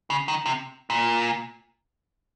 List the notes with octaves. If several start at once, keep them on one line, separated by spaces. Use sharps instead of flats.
C#3
D#3
C3
A#2